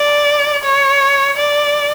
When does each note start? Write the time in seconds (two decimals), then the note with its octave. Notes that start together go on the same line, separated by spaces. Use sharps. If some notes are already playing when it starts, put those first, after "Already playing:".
Already playing: D5
0.63 C#5
1.37 D5